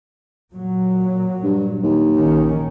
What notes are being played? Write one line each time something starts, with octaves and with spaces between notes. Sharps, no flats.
A#2 F#3
G2
D#2
A#1 D#3 C#4